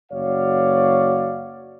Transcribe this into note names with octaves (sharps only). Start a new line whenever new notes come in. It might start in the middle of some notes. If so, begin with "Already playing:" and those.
F#1 F#4 C#5 D5 F5